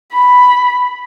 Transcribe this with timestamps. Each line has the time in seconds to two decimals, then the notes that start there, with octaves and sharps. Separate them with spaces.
0.12 B5